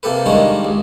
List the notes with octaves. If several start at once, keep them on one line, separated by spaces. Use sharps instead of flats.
C3 A#3 G4 A4 B4
D#3 G3 G#3 A#3 C#4 D4
C#2